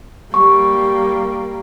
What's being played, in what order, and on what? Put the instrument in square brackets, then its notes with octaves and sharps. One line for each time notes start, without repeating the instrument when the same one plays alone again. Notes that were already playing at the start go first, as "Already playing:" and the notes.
[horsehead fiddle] G3 A#3 [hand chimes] C#6